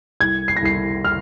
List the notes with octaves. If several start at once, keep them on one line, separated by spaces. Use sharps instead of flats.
C2 G#6
C7
A#6
C2 C7
F6